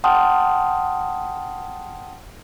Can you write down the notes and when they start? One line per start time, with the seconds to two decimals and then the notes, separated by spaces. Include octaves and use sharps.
0.04 F#5 G5 A5 C6 D#6 F6